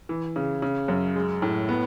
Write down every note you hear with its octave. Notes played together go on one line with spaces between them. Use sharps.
E3
C#3
C#3
F#2
G#3
A2
B3